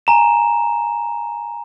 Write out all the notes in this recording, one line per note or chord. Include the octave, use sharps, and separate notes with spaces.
G#5 A#5 E7